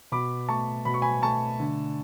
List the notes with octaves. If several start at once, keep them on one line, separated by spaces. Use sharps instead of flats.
B2 B5 D6
A3 A5 C#6
B2 B5
C#6
G#5 B5
A3 A5 C#6
D3